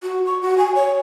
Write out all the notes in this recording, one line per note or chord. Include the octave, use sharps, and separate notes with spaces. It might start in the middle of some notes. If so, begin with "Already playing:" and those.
F#4
C#6
F#4
G#5
C#5